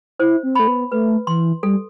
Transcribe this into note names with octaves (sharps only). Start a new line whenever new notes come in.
E4 C5
C4
A3 B5
B3
A3 B4
E3 C6
G3 A4